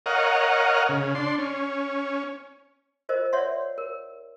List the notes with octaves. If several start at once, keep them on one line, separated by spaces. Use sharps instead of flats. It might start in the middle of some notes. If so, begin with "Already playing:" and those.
A#4 C#5 D#5 F5 F#5
C#3
D4 C6
C#4
F4 A#4 C5 D#5
C#5 D5 E5 F#5 C6
A#4